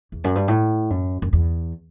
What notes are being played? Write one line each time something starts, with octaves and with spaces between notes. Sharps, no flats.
E2
F#2
G2
A2
F#2
F#2
E2